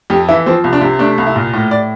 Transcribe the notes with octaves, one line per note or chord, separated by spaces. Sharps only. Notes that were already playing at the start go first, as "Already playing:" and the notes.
F2 G4
E3 E4
F3 C4
C2
D4
C3
A3 D4
C2
E4
A#2
A2
A2 D5